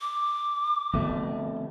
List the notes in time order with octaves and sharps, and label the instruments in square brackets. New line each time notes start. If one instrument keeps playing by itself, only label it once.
[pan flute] D6
[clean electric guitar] F2 B2 A3 [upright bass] D3